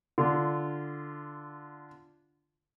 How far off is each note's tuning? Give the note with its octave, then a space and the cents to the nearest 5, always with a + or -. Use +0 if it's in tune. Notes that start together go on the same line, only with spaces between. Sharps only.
D3 +0 F4 -15